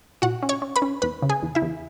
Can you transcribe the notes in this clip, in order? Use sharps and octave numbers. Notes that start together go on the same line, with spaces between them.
A#2 F#4 F#5
C#4
C#5 C#6
C#4
B4 B5
C#4
E2 B4 B5
C#3
G#4 G#5
E2
E4 E5
E2